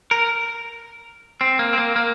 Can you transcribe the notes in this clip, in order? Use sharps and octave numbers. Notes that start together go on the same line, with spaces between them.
A#4
C4
A#3
C4
A#3
A#3